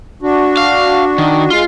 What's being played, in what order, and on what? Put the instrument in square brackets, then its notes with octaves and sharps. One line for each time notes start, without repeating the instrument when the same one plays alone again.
[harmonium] D4 F#4
[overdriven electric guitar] F5
D#3
[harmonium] G#3 [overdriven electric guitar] F4